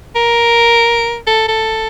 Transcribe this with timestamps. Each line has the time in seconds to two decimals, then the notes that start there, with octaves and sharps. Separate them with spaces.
0.15 A#4
1.27 A4
1.48 A4